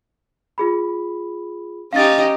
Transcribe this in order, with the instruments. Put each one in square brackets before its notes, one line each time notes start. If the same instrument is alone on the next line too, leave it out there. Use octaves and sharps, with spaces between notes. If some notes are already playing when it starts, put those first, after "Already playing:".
[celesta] F4 G#4 B5
[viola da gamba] C#4 D#4 G4 [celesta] F5 A6